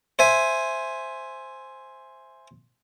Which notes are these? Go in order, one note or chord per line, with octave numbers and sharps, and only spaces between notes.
C5 E5 G#5